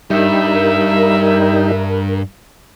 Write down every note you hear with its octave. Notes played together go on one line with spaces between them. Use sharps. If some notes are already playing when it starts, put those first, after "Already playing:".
G2 G3 D#4 A#4 E5